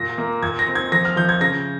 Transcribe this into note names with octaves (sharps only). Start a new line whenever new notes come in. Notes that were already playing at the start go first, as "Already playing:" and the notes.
Already playing: A#2 A#6
A#3
A#2 G#6
A#6
C4
G#6
F3 A#6
F6
F3 G6
G#6
C#3 A#6